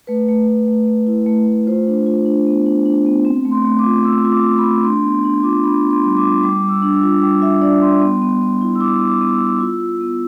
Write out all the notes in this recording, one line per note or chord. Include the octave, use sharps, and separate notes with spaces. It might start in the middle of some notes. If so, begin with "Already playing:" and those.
A3 B4
A3
A3
A3
A3
E4
A3
A3
F4 C5
D4
F4
D4
B3
D4
D4
B3
C4
A3
C6
A3
D6
F4
A3 E6
F4
D6
A3
B5
A3
D4 C6
B3 C6
D4 C6
F4 D6
D4 B5
B3
C6
G3
D6
F4
G3 D6
G3
E6
D4
E6
F4
G3 D6
F4 E5
D4 D5
G3 C6
B3
B3
B3
E4
E6
E4 D6
B3
D6
B3
E6
B3
F4
F4
B3